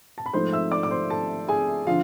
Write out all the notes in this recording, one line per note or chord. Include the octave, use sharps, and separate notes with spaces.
A5
B5
G#2 F3 A3 C5 C6
E5 E6
D5 D6
D6
C5 C6
A4 A5
G#4 G#5
D3 F3 F4 F5